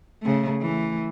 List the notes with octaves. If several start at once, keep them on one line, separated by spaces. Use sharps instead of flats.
C#3 A3
E3 A3